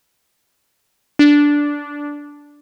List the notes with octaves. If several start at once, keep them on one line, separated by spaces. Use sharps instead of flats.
D4